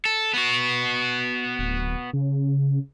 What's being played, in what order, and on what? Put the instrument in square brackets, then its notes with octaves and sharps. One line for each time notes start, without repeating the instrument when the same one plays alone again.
[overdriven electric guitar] A4
B3 F#4
[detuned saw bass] D1
C#3